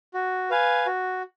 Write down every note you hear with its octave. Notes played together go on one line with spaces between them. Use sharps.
F#4
B4 F5 G#5
F#4